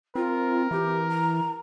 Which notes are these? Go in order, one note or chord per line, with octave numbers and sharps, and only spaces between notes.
C4 F4 A#4
E3 G4
A#5